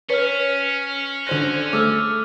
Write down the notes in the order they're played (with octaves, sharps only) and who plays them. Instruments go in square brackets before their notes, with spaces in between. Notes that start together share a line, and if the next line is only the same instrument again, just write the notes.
[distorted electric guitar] C#4 [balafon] B4 C#5 [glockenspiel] F6 B6
[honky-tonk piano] D3 C5 A#6 [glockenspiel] F#6 D#7 F7
[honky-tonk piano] A3 [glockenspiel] D6 E6 F6